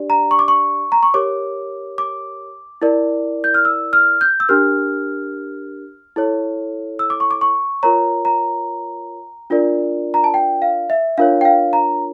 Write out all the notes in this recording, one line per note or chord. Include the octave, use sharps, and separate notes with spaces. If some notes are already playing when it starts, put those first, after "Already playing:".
Already playing: D4 G4 D5
A#5
C#6
D6
C#6
A#5
C#6
G4 A#4 C#5 D6
D6
E4 A#4 D5
G6
F6
E6
F6
G6
E6
D4 G4 A#4 F6
E4 A4 C#5
E6
D6
C#6
D6
C#6
F4 A#4 C#5 A#5
A#5
D4 F4 A#4 D5
A#5
A5
G5
F5
E5
D4 F4 A#4 C#5 F5
G5
F5
A#5